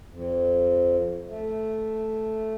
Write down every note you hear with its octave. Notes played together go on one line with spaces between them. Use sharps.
F2
A3